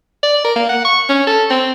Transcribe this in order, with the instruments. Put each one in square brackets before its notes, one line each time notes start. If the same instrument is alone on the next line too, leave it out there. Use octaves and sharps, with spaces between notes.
[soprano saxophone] D5
A#4
A#3
F#5
C#6
C#4
A4
C4